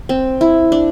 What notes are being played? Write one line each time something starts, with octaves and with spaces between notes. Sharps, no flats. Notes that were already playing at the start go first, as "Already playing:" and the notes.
C4
E4
D4